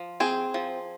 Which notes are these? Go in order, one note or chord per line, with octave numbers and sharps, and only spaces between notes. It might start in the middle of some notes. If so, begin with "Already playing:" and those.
Already playing: F3
C4 G#4
F3